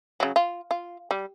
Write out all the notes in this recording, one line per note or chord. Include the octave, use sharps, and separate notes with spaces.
C#3 F#3
F4
F4
G3